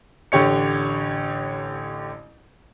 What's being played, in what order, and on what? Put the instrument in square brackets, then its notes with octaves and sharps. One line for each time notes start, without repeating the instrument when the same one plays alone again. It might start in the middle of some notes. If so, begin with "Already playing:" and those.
[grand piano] A1 D3 G4 C#5 C#7